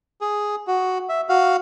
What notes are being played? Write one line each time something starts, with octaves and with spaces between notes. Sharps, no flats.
G#4
F#4
E5
F#4 F5